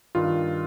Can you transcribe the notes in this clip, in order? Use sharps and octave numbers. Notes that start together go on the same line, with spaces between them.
G2 D#3 F4